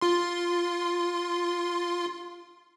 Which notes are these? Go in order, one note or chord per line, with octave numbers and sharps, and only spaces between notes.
F4 C6